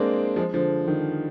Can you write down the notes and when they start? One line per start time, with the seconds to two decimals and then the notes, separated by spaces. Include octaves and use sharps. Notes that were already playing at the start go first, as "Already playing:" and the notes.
Already playing: G#3 A#3 C4 D4
0.36 F3 G#3
0.54 D3 F3
0.88 D#3